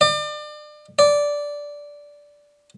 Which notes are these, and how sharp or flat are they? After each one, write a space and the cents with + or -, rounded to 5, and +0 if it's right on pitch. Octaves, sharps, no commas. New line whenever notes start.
D5 +35
D5 -10